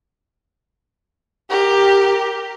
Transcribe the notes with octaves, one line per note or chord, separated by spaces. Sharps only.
G4 A#4